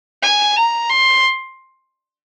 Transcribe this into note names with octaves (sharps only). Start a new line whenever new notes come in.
G#5
A#5
C6